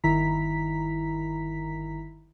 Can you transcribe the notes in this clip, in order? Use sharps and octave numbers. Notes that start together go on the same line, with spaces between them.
G1 D#3 E4 A#5 B6